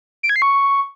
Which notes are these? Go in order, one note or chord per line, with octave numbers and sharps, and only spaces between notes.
D7
G#6
C7
C#6